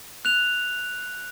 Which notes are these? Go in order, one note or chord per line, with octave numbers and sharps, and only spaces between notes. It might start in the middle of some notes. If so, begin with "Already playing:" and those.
F#6 F7